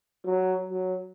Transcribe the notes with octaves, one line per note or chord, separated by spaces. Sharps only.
F#3
F#3